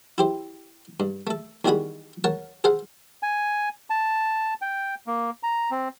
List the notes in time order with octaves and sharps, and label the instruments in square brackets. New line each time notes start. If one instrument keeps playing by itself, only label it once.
[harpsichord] E4 G4 C5
G2
A3 A4
E2 D#3 G3 F#4 G#4 B5
A#4 C#5 F#5 A5
G#4 A4 C5 F5 F#5
[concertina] G#5
A5
G5
A#3
A#5
C4